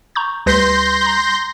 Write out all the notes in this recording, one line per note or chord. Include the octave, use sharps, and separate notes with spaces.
A#5 C#6 G6
D2 G3 B4 C6 G6 A#6 B6
A#5